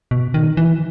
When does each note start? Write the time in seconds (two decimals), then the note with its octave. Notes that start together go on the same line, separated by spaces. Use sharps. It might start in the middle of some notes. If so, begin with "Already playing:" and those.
0.11 B2
0.34 D#3
0.57 E3